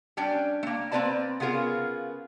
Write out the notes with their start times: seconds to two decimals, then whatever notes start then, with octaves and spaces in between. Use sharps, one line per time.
0.17 G3 C#4 D4 G5
0.63 A3 A#3
0.92 A#3 C4 F#4 B4 D5 A5
1.40 C#3 B3 F4 G#4 A#4